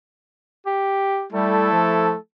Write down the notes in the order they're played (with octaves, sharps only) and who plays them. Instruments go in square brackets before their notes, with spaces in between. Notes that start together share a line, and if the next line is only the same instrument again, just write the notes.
[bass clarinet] G4
[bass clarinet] G3 [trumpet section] A3 E4 A4
[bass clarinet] F3